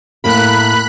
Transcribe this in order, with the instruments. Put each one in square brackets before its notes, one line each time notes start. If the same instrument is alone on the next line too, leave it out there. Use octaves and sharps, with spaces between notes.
[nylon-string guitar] A2 A#3 A#4 [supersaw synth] B5 F#6